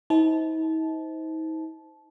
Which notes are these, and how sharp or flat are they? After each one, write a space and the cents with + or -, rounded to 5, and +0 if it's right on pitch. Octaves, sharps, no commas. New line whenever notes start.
D#4 +45 C5 -15 A5 -20